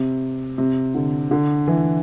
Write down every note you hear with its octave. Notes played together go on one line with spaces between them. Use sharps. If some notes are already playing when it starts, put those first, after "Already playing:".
Already playing: C3
C3
D3
D3
E3